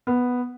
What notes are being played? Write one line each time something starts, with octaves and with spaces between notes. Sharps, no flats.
B3